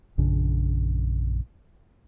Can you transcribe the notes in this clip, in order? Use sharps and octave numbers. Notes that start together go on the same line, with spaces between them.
A#1 F#2 C#3 D4